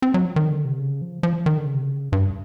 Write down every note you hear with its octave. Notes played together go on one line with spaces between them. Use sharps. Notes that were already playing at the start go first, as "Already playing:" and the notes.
C4
F#3
F3
D#3
D3
C3
C#3
F3
F3
D#3
D3
C#3
C3
C#3
G2